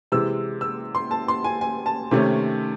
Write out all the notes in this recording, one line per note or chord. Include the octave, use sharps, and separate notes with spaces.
C3 E3 G#3 E6
E6
C6
A5
C6
G#5
G#5
A5
C3 D#3 A3 C#4